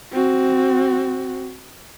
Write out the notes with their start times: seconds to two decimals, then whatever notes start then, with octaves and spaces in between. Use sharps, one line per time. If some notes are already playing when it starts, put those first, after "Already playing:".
0.11 C4 F#4